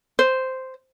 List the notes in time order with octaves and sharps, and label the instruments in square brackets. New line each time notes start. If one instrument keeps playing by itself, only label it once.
[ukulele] C5